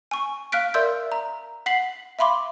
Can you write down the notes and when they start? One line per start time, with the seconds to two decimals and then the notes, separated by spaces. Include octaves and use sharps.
0.11 G#5 C#6
0.52 F5 F6 F#6 B6 D7
0.74 A#4 D5 E5 C6 E6 G6
1.12 A#5
1.66 F#5 B6 C7 F#7
2.19 E5 F5 B5 C6 D6